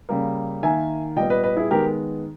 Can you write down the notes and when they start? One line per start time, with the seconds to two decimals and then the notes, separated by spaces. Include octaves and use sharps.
0.09 C#3 G3 A#3
0.63 D#3 A#3 E5 G#5
1.16 A#2 G3 B3 D#5 G5
1.30 B4 D#5
1.44 B4 D#5
1.57 E4 G#4
1.71 D#3 G#3 B3 G4 A#4